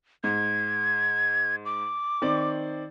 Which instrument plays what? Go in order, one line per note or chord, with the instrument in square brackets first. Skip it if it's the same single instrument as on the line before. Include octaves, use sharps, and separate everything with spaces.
[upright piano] G#2 [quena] G#6
[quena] D6
[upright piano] D#3 C4 D5